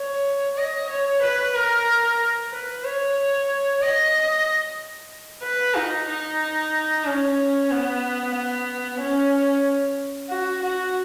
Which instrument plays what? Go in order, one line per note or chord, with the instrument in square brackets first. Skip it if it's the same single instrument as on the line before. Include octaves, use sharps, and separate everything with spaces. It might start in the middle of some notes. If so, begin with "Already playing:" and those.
Already playing: [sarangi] C#5
D#5
C#5
B4
A#4
B4
C#5
D#5
B4
D#4
D#4
C#4
B3
B3
C#4
F#4
F#4